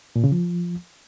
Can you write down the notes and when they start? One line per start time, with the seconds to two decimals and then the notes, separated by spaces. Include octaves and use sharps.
0.16 A#2
0.24 C#3
0.32 F3